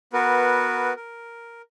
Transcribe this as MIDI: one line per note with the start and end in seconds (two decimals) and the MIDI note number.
0.13 0.93 59
0.13 0.93 66
0.13 0.93 70
0.13 0.93 71
0.96 1.62 70